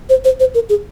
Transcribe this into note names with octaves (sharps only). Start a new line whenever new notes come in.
C5
C5
C5
A#4
G#4